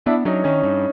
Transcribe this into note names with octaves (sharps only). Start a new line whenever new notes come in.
B3 D4 E4
F#3 C#4 D#4
D#3 C#4
G2